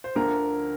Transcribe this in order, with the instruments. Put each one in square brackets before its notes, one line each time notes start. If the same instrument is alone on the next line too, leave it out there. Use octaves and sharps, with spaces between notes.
[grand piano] C5
D2 D3 F3 A#4